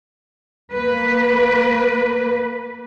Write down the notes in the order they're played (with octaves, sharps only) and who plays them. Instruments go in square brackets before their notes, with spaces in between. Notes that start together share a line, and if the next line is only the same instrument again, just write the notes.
[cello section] A#3 B4